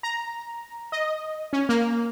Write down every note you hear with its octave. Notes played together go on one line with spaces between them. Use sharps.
A#5
D#5
C#4
A#3